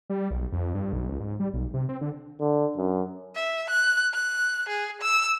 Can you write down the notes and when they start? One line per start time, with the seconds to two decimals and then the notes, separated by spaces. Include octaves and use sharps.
0.10 G3
0.31 B1
0.52 F2
0.74 G2
0.93 B1
1.09 C#2
1.20 G#2
1.40 G3
1.53 B1
1.74 C3
1.89 C4
2.01 D3
2.40 D3
2.77 F#2
3.35 E5
3.71 F#6
4.14 F#6
4.69 G#4
5.02 E6